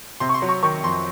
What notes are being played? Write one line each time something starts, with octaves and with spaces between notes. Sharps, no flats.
C3 C6
C#6
C6
F#3
C#6
D#3 C#6
F2 C6